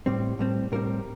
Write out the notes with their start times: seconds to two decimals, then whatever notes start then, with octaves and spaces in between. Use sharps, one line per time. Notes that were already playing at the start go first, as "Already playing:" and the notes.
0.06 A2 G3 C4
0.39 A2 G3 C4
0.72 A2 G3 C4 A#4